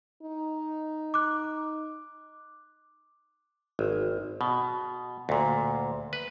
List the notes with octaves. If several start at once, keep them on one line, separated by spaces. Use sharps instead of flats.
D#4
D6 F#6
G#1
B2
D2 A#2
B4